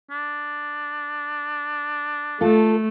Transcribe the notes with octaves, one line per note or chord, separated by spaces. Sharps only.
D4
A3 F4 A4